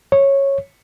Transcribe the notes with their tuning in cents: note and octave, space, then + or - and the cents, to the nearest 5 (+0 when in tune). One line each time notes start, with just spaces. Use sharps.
C#5 -10